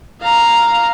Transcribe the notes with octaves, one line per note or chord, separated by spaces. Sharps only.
F5 A#5